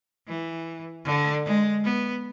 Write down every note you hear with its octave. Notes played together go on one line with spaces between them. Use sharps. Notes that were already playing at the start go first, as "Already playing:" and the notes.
E3
D3
G#3
B3